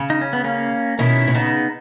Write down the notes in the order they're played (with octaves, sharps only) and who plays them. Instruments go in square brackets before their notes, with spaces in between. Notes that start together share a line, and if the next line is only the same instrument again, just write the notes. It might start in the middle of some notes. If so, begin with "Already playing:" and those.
Already playing: [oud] C#3
[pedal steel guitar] D#4
C#4
B3
A#3 C#4
[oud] B2 D#3 [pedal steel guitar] C#4 E4
[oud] B2
[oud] C#3 [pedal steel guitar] B3 D#4